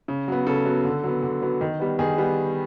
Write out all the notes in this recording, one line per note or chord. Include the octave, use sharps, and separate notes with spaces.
C#3
F#3 B3
C#3 A4
F#3 B3
D3
F#3 B3
D3
F#3 B3
D#3
G3 B3
D#3 G#4
G3 B3